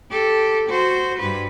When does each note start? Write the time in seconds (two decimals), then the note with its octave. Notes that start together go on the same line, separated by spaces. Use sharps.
0.10 G4 A4
0.69 F#4 C5
1.19 G2 B4